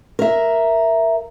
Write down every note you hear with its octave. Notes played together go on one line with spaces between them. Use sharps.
A#4 E5